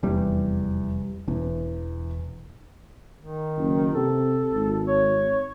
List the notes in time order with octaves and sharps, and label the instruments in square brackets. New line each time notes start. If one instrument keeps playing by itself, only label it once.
[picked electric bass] F1 G3 [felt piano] E2
[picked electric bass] E1 [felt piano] E2
[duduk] D#3
[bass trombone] F#1
[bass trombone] C3 [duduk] A4
[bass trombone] G#1
[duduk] C#5